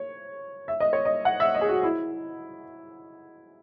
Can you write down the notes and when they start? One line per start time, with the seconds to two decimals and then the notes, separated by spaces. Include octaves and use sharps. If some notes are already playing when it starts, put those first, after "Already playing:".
Already playing: C#5
0.68 E5
0.80 D#5
0.93 C#5
1.05 D#5
1.25 F#5
1.40 E5
1.55 D#5
1.61 G#4
1.69 F#4
1.83 E4